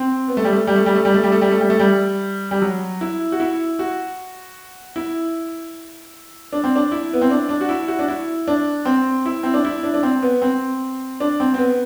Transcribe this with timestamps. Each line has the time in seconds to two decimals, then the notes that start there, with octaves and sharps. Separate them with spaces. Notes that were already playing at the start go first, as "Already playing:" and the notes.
Already playing: C4
0.28 B3
0.37 A3
0.45 G3
0.53 A3
0.67 G3
0.76 A3
0.86 G3
0.95 A3
1.05 G3
1.14 A3
1.24 G3
1.32 A3
1.41 G3
1.51 A3
1.60 G3
1.70 A3
1.80 G3
2.51 G3
2.62 F#3
3.01 E4
3.32 F#4
3.40 E4
3.79 F#4
4.96 E4
6.52 D4
6.64 C4
6.76 D4
6.92 E4
7.13 B3
7.22 C4
7.31 D4
7.49 D4
7.61 F#4
7.69 E4
7.88 F#4
7.99 D4
8.08 E4
8.47 D4
8.85 C4
9.26 E4
9.43 C4
9.54 D4
9.65 E4
9.83 D4
9.94 D4
10.03 C4
10.22 B3
10.42 C4
11.20 D4
11.40 C4
11.54 C4
11.58 B3